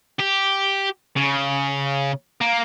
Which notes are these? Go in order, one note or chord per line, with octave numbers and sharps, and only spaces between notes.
G4
C#3
A#3